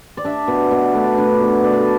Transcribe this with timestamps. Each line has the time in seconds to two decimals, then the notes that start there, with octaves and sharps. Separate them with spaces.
0.17 D5
0.25 D4 E5
0.48 B2
0.71 B2 E5
0.82 D5
0.93 A3 B4
1.04 D5
1.17 D4 B4
1.41 B2
1.63 B2 D5
1.72 B4
1.80 A4